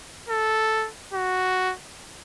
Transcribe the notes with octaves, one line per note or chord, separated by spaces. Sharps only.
A4
F#4